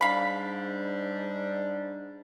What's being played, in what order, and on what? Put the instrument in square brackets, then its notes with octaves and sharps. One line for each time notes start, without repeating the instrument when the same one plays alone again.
[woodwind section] G#2 G3 D4 [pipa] F5 B5